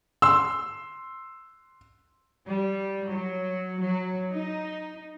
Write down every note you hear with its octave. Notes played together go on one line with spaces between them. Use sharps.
C6 E6
G3
F#3
F#3
D#4